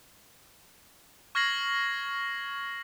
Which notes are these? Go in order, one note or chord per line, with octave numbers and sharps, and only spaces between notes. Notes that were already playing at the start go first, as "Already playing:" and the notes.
C#6 F6 G#6 A#6 C7 F#7